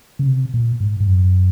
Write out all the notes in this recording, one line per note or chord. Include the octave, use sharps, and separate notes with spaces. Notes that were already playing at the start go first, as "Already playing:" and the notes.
C#3
C3
A#2
G#2
G#2
F#2